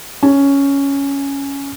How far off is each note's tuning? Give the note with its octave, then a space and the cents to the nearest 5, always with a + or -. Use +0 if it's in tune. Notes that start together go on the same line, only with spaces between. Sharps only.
C#4 +5